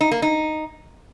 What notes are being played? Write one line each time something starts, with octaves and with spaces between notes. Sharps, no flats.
D#4
A#3
D#4